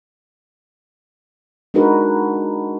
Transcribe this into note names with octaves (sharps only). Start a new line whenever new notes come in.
G#3 D4 D#4 F#4 A#4 B4